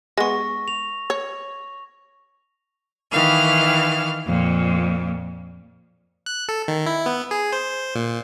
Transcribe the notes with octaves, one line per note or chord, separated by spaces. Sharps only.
G#3 B3 C#6 A#6
F7
C#5
D#3 E3 F5
F2 A#2
F#6
A4
D#3
E4
B3
G#4
C5
A#2